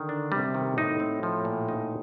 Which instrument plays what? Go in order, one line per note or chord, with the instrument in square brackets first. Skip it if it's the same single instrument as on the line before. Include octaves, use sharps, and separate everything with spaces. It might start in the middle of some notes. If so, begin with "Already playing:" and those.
Already playing: [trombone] D3 [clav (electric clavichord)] D#3
[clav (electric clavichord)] D4
[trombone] C3 [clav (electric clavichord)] G3
[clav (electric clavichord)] D#3
[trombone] A2 [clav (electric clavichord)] D#4
[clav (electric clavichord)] C4
F3
A#2
D#4